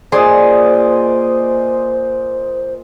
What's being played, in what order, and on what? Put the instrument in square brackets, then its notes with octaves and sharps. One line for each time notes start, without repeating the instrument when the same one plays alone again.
[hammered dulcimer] A#2 G#5 C6 [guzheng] G#4 [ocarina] C5 [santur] D5 D#5